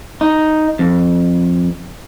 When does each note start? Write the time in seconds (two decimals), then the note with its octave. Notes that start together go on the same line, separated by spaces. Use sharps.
0.21 D#4
0.79 F2